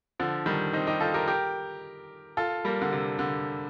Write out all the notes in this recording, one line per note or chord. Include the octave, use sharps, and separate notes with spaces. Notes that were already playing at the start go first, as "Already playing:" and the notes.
D3 F3
D#3 G3
C4 D#4
D#4 G4
F4 A4
G4 A#4
G4 A#4
F4 A4
G3 A#3
D3
C3
D3